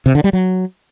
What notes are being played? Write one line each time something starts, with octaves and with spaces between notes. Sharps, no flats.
C3
D3
G3
F#3